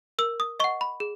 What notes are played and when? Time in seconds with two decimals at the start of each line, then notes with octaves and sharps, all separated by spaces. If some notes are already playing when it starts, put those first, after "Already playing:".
0.19 A#4 E6
0.40 D#6
0.60 D#5 F#5 C#6
0.81 B5
1.00 G#4